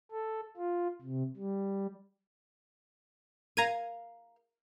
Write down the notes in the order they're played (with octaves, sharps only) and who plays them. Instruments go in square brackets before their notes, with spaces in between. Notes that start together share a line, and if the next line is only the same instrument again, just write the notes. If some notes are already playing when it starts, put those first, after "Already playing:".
[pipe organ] A4
F4
C3
G3
[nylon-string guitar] A#4 F5 [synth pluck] A#5 G#6 D#7